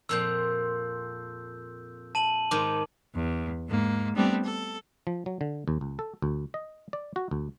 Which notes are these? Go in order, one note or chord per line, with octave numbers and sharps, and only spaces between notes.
F2 A#2 C4 E6 G6
A5 D#7 F#7
G#2 D#3 D6
E2
G#2 A#3
G3 A3 B3 C4 D4
A4
F3
F#3
D3
D#2
C#2
A4
D2
D#5
D5
F#4
D2